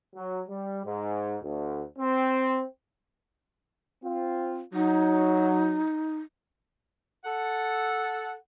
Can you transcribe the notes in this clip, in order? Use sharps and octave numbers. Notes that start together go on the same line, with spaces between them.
F#3
G3
G#2
D2
C4
C4 F4
F#3 D#4
A4 F#5